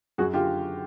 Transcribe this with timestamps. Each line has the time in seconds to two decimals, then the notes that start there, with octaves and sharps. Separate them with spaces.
0.18 F#2 F#4 G#4
0.33 D3 F4 G4